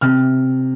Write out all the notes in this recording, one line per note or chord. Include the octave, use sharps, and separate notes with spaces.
C3 F6